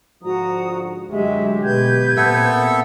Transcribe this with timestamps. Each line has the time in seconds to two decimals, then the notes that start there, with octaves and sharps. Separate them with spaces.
0.23 G#2 D3 F3 F#4 A#5 D#6
1.12 F#2 D3 F#3 G#3 A3 G4 E5
1.64 B2 B4 G6 G#6
2.17 A#2 B3 C4 A4 E5